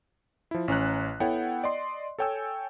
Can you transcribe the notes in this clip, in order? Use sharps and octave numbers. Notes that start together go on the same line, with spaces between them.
F3 E4
A1 C#4 A#5 F#6
B3 E4 A4 C#5 F#5 G5
D5 D#5 C6
A4 C#5 G5 G#5 E6